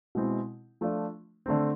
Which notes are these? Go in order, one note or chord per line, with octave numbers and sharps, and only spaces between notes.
B2 G#3 C4 E4
F3 A3 D4 F4
D3 A3 C4